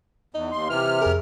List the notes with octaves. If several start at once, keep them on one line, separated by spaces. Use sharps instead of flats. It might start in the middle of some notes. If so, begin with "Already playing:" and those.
E2 D#4
D#2 C6
C3 E3 F6
F2 G#4 A#4